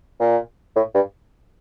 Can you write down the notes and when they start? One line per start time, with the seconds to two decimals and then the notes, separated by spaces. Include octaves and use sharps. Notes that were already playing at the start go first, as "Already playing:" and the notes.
0.20 A#2
0.76 A2
0.94 G2